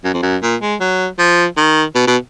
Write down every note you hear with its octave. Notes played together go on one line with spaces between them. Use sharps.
F#2
F2
F#2
A#2
G#3
F#3
F3
D#3
B2
B2